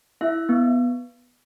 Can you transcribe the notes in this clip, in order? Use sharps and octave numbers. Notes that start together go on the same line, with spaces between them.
E4 E5
B3